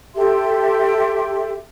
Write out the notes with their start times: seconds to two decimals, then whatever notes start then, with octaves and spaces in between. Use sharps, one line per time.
0.15 G4 A4 E5 C6